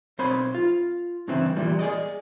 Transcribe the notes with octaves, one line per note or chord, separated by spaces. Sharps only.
B1 C4 C5 C#5 B5
F4
G2 C#3 E3 C4 E4
E2 A#2 E3 G3
G#4 D5 D#5